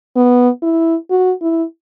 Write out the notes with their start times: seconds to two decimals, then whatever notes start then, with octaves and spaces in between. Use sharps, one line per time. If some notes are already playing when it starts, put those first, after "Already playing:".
0.16 B3
0.62 E4
1.10 F#4
1.42 E4